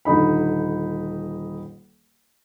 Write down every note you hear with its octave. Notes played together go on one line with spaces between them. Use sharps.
D#1 D3 D#4 B5